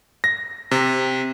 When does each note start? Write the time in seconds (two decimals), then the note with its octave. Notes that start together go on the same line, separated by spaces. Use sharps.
0.24 A#6
0.71 C3